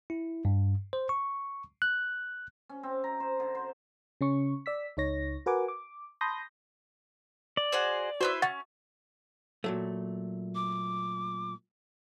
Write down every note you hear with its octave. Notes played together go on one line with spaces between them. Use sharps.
E4
G2
C5
C#6
F#6
C#4
C4
A#5
C5
D3
C5
C#3 C#4 C#6
D5 E6 B6
C#2 D#4 C#5 A#6
F#4 A#4 B4 F#5 G#5 D6
D6
A5 B5 C6 D#6 G6 A#6
D5
F#4 G#4 C5
E4 F#4 B4 C5
C#4 F#5 C#6 A6
A#2 F#3 A3
D6